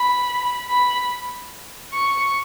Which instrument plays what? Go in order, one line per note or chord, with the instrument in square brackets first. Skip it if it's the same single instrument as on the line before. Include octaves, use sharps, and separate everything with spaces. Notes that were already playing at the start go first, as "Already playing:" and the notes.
Already playing: [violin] B5
B5
C#6